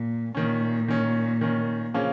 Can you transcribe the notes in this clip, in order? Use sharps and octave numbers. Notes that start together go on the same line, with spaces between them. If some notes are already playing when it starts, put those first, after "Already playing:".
Already playing: A#2
A#2 D#3 C#4
D#3 C#4
D#3 C#4
C#3 F3 A#3 C#4